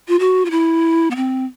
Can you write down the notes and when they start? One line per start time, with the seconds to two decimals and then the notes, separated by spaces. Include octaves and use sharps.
0.08 F4
0.19 F#4
0.45 F4
0.51 E4
1.11 B3
1.16 C4